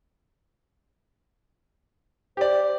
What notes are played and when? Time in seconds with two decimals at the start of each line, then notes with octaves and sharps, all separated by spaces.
2.37 G4 C5 D5